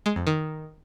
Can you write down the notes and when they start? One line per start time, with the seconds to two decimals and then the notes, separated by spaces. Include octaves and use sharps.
0.06 G#3
0.16 F2
0.27 D#3